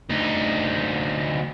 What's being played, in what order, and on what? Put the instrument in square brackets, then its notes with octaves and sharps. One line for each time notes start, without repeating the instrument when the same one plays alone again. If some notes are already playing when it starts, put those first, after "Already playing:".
[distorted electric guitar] D2 D#4